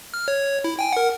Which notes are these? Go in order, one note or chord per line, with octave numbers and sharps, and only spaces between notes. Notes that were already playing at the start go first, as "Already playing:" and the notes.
F6
C#5
E4
G5 G#5
A#4 F#5